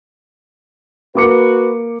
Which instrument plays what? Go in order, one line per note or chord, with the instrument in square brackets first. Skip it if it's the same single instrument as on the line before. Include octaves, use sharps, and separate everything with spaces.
[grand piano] A#3 D6 C#7 [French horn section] F#4 B4